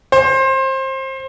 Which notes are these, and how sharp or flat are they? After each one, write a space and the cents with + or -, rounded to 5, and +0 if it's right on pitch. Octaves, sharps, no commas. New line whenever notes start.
C5 +25